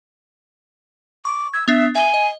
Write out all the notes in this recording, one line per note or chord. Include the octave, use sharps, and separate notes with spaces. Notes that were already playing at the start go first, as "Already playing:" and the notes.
C#6 D6
E6 G#6
B3 D4 E5
E5 G#5 G7
D#5